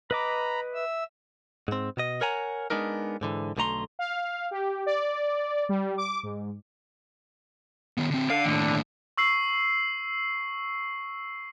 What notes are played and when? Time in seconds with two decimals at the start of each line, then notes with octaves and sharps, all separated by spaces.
0.11 B4 D#5 A#5 B5 D6
0.74 E5 E6
1.68 G#2 C4
1.97 B2 D#5
2.21 A#4 C#5 F#5 G#5 A#5
2.70 G#3 B3 D4 D#4 A#4
3.21 G#2 D3 E3
3.57 B1 D3 A3 A#5 C6
3.99 F5
4.51 G4
4.86 D5
5.69 G3
5.98 D6
6.23 G#2
7.98 D#3 B3
8.11 D3 C4
8.30 D3 F5
8.45 D#2 A2
9.17 C#6 E6 C7